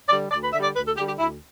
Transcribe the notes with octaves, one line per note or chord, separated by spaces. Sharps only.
D3 G3 D5
D2 D5
B4
D3 G3 E5
D5
D2 B4
A4
D3 G3 G4
G4
D2 E4